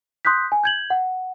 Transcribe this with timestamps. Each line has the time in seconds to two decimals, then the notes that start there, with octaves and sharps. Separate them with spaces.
0.25 C6 D#6 F#6 G6 B6
0.52 G#5
0.64 G6 G#6 F#7
0.90 F#5